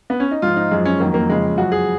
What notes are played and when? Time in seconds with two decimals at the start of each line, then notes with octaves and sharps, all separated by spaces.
0.10 B3
0.20 C#4
0.31 D#4
0.42 G#2 F3 F4
0.56 D#4
0.71 F#2 F3 G#3
0.85 C#4
1.00 F2 D#3 F#3 A#3
1.14 A#3
1.29 F2 C#3 F3 G#3
1.58 F#2 F3 F#4
1.72 G#4